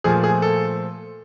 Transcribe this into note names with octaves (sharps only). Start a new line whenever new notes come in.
A#2 F3 A3 G#4
G#4
A4